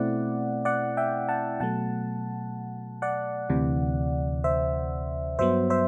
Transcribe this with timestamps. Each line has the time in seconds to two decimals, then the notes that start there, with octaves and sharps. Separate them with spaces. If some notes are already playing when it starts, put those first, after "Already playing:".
Already playing: B2 A3 C4 E4 D5 F#5
0.65 D5 F#5
0.97 E5 G5
1.29 F#5 A5
1.60 B2 F#3 A3 F#5 A5
3.02 D5 F#5
3.49 D2 C3 E3
4.44 C5 E5
5.39 G2 F#3 B3 C5 E5
5.70 C5 E5